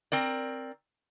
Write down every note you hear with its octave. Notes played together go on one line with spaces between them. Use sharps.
C4 A#4 D5